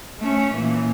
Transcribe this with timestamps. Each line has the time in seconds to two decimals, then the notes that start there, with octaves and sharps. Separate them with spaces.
0.20 A3 C#4
0.54 A#2 E3